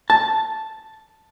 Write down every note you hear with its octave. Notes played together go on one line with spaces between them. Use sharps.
A5